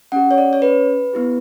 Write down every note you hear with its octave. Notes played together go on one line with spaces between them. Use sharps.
C#4 G4 F#5
C#5
D5
C#5
B4
B3 E4 G4